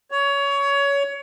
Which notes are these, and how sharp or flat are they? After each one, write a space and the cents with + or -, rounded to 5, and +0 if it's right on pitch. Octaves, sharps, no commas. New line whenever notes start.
C#5 +20